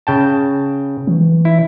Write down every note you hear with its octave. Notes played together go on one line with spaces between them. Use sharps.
C#3 G5 A5
E3
E4